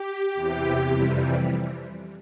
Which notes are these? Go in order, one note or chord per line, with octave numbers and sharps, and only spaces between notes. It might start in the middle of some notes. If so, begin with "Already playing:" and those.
Already playing: G4
E2 C3 E3 G4
F2 C3 E3 G3